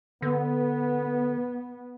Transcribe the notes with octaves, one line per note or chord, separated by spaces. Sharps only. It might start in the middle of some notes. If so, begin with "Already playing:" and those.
D3 B3